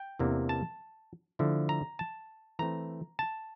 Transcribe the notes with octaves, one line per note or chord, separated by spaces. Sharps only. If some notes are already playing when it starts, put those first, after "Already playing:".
Already playing: G5
E2 C3 E3 A#3 D4
A5
D3 F3 A3 E4
A#5
A5
E3 A3 C4 A#5
A5